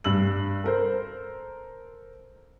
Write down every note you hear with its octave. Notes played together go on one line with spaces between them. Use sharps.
G2 E6 F#7
A4 A#4 C5